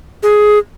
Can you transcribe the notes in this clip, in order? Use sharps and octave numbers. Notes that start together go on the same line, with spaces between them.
G#4